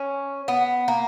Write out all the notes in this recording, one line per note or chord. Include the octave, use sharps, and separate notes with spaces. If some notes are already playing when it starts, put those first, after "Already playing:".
Already playing: C#4
B3
A#3